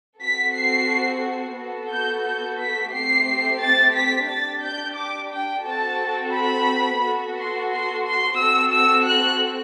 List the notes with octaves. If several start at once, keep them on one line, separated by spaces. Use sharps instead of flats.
C4 F#4 A4 B6
C7
B3 F#4 A4
G6
G6
B6
A3 C4 G4 C7
A6
B6
D4 G4 A6
G6
D6
G5
C4 F#4 A4 A5
B5
B3 F#4 A4
C6
C6
C6
C4 F#4 A4 E6
E6
F#6